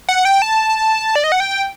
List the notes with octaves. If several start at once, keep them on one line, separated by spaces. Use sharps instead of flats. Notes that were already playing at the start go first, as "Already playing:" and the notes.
F#5
G5
A5
D5
D#5
F#5
G5